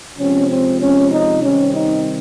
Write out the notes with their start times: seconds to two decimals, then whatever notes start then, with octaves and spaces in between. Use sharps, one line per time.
0.18 C3 F3 G#3 C4 C#4
0.49 C4
0.80 C#4
1.11 D#4
1.42 C3 D#3 G3 C4 C#4
1.73 D#4